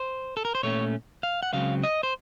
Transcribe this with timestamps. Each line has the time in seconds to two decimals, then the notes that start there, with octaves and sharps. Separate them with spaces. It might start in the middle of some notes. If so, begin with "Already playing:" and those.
Already playing: C5
0.37 A4
0.45 A#4
0.55 C5
0.63 A#2 A3 C#4 C#5
1.23 F5
1.43 F#5
1.53 C#2 C#3 F#3 C4 F5
1.83 D#5
2.03 C5